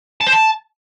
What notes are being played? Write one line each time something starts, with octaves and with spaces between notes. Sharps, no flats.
A5
C5
A5